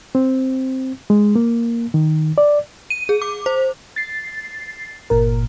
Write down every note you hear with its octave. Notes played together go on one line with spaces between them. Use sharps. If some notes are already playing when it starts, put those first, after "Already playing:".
C4
G#3
A#3
D#3
D5
D#7
G#4
D6
C5
A6 C7
G1 A#2 A#4